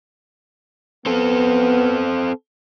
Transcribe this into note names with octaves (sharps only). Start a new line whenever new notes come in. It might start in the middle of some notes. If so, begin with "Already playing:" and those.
B3 C4 A4